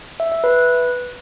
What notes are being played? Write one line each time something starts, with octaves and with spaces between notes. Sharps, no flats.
E5
E5
B4